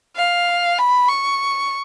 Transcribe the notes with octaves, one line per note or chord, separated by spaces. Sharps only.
F5
B5
C#6